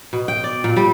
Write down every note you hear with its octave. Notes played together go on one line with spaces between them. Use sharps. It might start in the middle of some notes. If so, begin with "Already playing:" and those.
B2
G5
D5
A#2
G3